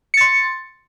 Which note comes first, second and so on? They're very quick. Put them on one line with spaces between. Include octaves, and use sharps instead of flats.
C#7 A6 C6